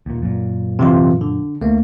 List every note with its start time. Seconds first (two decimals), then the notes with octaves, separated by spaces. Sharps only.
0.06 D#2 A#2
0.22 F#2 A#2
0.79 C3 E3 F4
1.21 D3
1.61 D2 A3 A#3